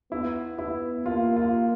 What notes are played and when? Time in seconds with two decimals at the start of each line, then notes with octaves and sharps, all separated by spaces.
0.12 B3 E4
0.59 E4
1.06 A#3 F4
1.36 F4